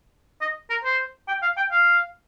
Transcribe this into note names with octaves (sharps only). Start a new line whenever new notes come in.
D#5
A#4
C5
G5
F5
G5
F5